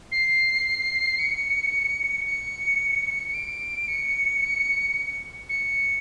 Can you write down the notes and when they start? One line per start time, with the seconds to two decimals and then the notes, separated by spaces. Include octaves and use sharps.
0.12 C7
1.19 C#7
2.26 C#7
3.29 C#7
3.34 D7
3.88 C#7
5.49 C#7